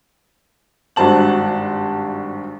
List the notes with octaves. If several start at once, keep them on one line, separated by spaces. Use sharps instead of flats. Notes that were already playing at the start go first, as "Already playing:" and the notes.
G#1 G2 F#4 C5 A5 F#7